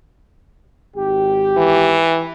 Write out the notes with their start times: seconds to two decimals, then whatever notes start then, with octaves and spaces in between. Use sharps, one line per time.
0.96 G#1 G4
1.57 E3